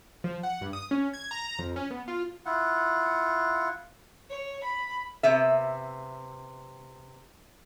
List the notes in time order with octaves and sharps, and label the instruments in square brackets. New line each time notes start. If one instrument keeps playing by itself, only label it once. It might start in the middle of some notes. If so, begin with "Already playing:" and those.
[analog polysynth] F3
F#5
G2
D#6
C#4
G#6
A#5
F2
C#4
B3
F4
[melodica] E4 F4 F#5
[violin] C#5
B5
[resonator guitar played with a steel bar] C3 B3 E5